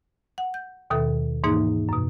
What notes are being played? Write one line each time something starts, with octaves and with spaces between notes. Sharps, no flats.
F#5
G6
D#2 B2 D#3 A4 E5
G#2 E3 A#3 D#4 G#4
F#2 B2